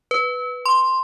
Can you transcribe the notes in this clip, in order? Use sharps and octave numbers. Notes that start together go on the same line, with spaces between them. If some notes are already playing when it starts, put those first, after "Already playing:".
B4
C6